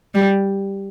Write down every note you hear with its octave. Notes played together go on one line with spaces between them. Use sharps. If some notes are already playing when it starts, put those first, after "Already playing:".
G3